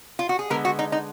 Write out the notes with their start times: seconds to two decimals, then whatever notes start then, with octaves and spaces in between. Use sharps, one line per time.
0.19 F4
0.29 F#4
0.39 G#4
0.50 D3 G#3 B3 A#4
0.65 F#4
0.79 D#4
0.92 D#4